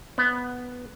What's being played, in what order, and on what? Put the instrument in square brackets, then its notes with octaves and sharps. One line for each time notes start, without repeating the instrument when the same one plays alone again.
[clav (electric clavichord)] B3